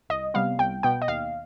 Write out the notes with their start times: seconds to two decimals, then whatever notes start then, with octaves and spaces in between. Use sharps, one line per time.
0.09 C2 D#5
0.34 C3 G3 B3 F5
0.58 C2 G5
0.83 B2 B3 G5
1.02 D#5
1.08 D#2 F5